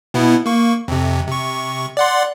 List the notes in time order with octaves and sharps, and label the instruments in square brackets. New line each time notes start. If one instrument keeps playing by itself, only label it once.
[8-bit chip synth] B2 B3 E4
A#3 C#6
F2 C3
C3 C#6
D5 F#5 C6